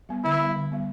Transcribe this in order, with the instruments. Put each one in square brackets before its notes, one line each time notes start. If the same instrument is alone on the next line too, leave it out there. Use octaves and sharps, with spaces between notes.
[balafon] G3 B3
[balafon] D3 [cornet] E4
[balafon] G3 B3
D3
G3 B3